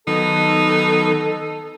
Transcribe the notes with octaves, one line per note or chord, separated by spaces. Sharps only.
D#3 F#3 B3 D#4 A4